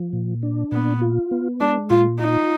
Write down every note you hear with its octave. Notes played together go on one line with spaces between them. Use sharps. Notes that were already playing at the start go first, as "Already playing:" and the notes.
Already playing: F3
A#2
D4
A#2 B3
F4
B3
G#3 D4
A#2 F4
D#4 F4